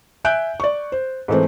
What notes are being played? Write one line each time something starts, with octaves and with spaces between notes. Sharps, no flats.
E5 G#5 F#6 G6 D7
D5 C#6
C5
G#2 E3 A3 C4